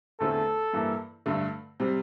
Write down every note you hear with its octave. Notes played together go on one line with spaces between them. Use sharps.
E2 D3 A3 C4 F4 A4
G2 E3 A#3 E4
G2 D3 A3
C3 G3 C4